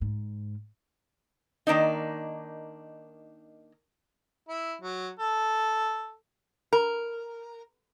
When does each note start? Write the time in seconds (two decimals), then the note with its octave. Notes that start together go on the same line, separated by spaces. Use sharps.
0.01 G#2
1.67 D#3 A#3 D4 D#4
4.49 E4
4.82 F#3
5.19 A4
6.73 A#4